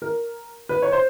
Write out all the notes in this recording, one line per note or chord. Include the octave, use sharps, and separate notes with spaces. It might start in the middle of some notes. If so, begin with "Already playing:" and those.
A#4
B4
C#5
C5